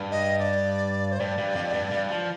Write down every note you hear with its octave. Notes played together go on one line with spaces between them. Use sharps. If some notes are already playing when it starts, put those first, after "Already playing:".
Already playing: G2
D#5
D5
C5
G2 D5
G2
F2
G2
G2
F3